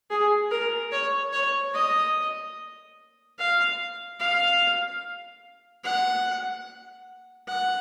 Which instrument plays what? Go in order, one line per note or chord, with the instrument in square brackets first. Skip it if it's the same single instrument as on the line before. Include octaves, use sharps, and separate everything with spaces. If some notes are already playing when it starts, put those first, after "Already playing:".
[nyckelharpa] G#4
A#4
C#5
C#5
D#5
F5
F5
F#5
F#5